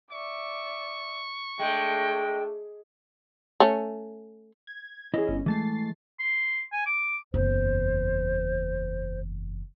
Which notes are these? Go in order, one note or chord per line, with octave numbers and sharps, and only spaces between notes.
D5 E5 C#6
G#3 A3 D4 G5
A3 C#4
G#6
E3 C#4 E4 G#4 D#5
G1 C#4
E3 G#3 A3 A6 C7
C6
G#5
D6
F#1 E2 C5